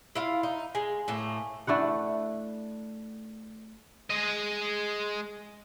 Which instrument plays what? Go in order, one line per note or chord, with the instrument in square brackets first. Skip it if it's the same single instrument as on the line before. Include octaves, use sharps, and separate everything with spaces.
[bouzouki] E4 F4 F5
D#4
[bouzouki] G#3 [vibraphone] G#5
[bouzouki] A2 A3 A#3
[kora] A3 D4 E4 F#5
[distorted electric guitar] G#3 D#5